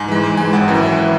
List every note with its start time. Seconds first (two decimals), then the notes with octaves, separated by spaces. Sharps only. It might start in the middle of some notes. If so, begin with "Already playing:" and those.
Already playing: G#2 G#5
0.08 E3 G#3
0.23 G#2
0.37 E3 G#3 G#5
0.53 G#1 F#5
0.68 F#2 E3
0.83 G#1 E5
1.00 E3